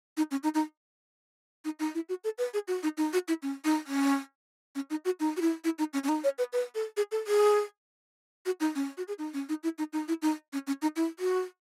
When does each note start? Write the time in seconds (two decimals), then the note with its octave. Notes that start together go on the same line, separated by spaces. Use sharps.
0.17 D#4
0.31 C#4
0.43 D#4
0.54 D#4
1.65 D#4
1.79 D#4
1.95 E4
2.09 F#4
2.24 A4
2.38 B4
2.54 G#4
2.68 F#4
2.83 D#4
2.97 D#4
3.13 F#4
3.28 E4
3.42 C#4
3.64 D#4
3.87 C#4
4.75 C#4
4.90 D#4
5.05 F#4
5.20 D#4
5.37 F#4
5.41 E4
5.64 E4
5.79 D#4
5.93 C#4
6.04 C#4
6.09 D#4
6.24 C#5
6.38 B4
6.53 B4
6.75 A4
6.97 G#4
7.12 A4
7.27 G#4
8.46 F#4
8.60 D#4
8.75 C#4
8.97 F#4
9.08 G#4
9.18 D#4
9.34 C#4
9.49 D#4
9.63 E4
9.78 D#4
9.93 D#4
10.08 E4
10.22 D#4
10.53 C#4
10.67 C#4
10.82 D#4
10.96 E4
11.19 F#4